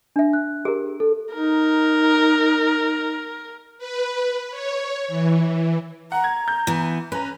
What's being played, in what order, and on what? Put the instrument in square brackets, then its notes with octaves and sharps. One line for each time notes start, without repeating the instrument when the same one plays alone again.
[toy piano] D4 E5
[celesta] F#6
[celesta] G4 [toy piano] G#4 A#4
[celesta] A4
[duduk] D#4 [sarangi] A#4
[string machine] B4
C#5
E3
[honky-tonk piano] F#5 [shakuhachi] A#5
[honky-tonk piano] G#6
G6
[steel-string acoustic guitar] E3 B3
[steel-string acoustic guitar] C#4 [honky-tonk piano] B4 A#5